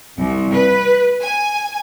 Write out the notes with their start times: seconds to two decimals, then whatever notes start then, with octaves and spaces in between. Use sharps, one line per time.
0.18 C2
0.53 B4
1.21 G#5